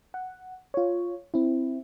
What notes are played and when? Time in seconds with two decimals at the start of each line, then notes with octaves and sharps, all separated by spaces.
0.14 F#5
0.74 F4 C#5
1.34 C4 E4